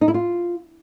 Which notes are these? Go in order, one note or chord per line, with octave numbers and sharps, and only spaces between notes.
D#4
E4
F4